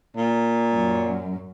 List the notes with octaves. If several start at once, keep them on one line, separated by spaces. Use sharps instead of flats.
A#2
F#2